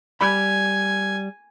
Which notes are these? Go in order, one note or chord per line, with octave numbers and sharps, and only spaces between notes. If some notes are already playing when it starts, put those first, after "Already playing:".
G3 D5 G#5 B5